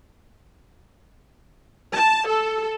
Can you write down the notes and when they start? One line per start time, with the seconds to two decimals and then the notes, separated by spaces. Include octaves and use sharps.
1.92 A5
2.27 A4